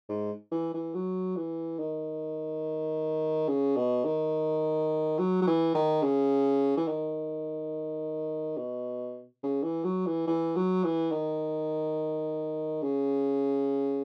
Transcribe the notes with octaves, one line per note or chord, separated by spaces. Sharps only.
G#2
E3
E3
F#3
E3
D#3
C#3
B2
D#3
F#3
F#3
E3
D#3
C#3
E3
D#3
B2
C#3
E3
F#3
E3
E3
F#3
E3
D#3
C#3